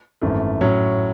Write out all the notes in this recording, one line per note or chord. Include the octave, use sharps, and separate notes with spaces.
G#1 F#2 E3 A3
A2 F#3 C#4